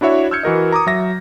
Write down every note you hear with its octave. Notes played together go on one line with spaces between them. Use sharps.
D4 E4 F#4 C#5 E5
E6 F6 G6 G#6 C#7
E3 F#4 A#4 D#5
A#5 D6 D#6
F#3 E5 A#6